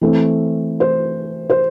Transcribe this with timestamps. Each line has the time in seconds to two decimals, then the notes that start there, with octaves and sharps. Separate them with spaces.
0.01 E3 A3 C4
0.80 C5
1.50 C5